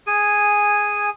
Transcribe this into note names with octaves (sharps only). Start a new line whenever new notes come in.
G#4 G#5